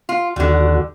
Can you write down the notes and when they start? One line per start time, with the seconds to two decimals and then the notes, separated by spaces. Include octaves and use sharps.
0.09 F4
0.36 D#2 D3 G3 F#4